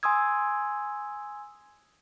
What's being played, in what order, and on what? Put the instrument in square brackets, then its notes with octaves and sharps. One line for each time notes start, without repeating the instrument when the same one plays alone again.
[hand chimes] G#5 C6 D#6 E6 G#6